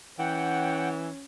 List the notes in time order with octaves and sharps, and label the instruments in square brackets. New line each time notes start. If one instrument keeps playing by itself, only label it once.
[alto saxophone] E3 [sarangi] C#4 [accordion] F#5 G5